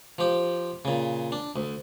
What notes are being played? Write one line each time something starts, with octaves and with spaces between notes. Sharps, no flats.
F3 G4
A#2 C#3
D4
D2